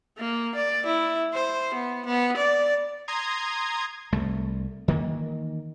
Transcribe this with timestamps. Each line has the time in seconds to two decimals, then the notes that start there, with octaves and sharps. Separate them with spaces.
0.18 A#3
0.55 D5
0.86 E4
1.33 C5
1.74 B3
2.06 B3
2.37 D5
3.08 A#5 C6 D#6 G#6
4.12 C2 A3
4.88 D#3 E3 A#3